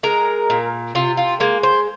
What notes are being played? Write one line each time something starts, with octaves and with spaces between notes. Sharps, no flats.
G#3 A#4
A#2
C3 F4
F4
G#3 A#3
C5